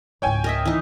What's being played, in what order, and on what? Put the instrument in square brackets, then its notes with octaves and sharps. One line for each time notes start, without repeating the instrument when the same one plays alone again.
[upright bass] C#2 G#2 [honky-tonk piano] C#5 G5 G#5
[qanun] A#4 D#5 E5
E3 D#4